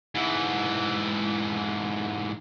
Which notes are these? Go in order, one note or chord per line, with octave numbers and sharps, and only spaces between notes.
G#2 E3